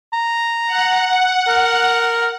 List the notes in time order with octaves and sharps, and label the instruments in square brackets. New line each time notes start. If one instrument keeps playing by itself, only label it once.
[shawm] A#5
[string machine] F#5
[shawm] A#4